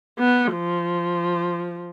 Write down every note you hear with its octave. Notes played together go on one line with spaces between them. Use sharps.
B3
F3